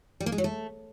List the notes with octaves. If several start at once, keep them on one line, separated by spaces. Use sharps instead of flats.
G3
A#3
G#3
F#3
A3